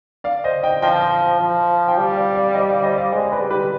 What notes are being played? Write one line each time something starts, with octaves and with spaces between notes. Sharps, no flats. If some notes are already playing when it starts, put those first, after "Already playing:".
D5 F5
C5 D#5
D#5 G5
F3 D#5 G5
F3
G5
G3 D5 F5
D5 F5
D5 F5
C5 D#5
D5 F5
C5 D#5
D5 F5
G#3 C5 D#5
B4 D5
G3
G4 B4